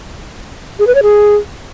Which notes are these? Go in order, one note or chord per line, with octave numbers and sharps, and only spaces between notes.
G#4
B4
C#5
G#4